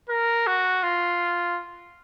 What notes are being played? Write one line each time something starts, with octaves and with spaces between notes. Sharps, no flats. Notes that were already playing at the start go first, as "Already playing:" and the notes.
A#4
F#4
F4